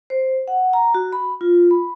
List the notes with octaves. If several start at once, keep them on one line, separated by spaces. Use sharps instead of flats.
C5
F#5
A#5
F#4
B5
F4
B5